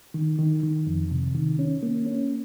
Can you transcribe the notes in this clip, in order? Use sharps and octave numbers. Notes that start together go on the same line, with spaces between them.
D#3
D#3
D#3
F2
C3
D#3
C#4
A#3
C#4